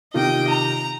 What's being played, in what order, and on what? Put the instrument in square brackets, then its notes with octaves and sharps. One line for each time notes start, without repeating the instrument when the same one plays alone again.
[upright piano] C3 D#3 F4 [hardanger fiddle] D#5 G5
[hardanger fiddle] A#5